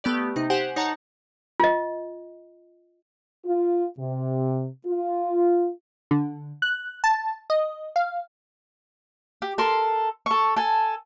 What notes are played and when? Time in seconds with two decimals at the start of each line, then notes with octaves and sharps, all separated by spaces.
0.04 A3 B3 G4 D5
0.36 C3 D#4
0.50 G4 C5 F#5 G#5
0.76 D#4 C#5 F#5 A5 A#5
1.60 F4 D#5
3.46 F4
3.98 C3
4.86 F4
6.11 D3
6.62 F#6
7.04 A5
7.50 D#5
7.96 F5
9.42 G4
9.58 A4 A#4 C6
10.26 A4 C#6
10.56 A4 G#5